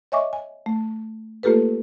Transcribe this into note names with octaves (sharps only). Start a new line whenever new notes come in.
C#5 D#5 E5 G#5 C#6 D6
G#5
A3
A3 A#3 F4 G4 A4 B4